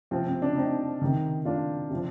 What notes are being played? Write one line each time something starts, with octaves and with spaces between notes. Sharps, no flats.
C3 F3 C4
C4
D4
C4 D#4
C3 D#3
D4 F4
C3 F3